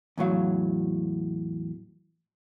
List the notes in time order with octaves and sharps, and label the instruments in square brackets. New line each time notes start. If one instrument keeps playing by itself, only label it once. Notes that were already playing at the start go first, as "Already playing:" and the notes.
[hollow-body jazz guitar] E2 A2 F#3 F5